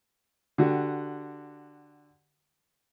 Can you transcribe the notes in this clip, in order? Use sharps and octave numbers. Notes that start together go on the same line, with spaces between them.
D3 F#4 G4